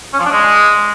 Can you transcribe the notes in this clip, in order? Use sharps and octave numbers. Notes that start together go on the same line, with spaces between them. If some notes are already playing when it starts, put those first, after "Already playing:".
C#4
F3
D4
G#3